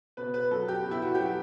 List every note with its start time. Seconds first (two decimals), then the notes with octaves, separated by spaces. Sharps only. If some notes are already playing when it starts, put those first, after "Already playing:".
0.17 B2 B4
0.34 B4
0.51 F#3 A4
0.68 G4
0.85 B2
0.91 E4
1.02 F#4
1.15 G4
1.19 F#3 F#4